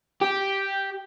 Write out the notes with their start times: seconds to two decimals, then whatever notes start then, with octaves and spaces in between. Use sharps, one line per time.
0.22 G4